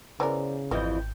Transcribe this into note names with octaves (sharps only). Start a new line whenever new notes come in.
C#3 E3 B3 A#4 C5 D5
G#1 F2 E3 G3 D#5 G6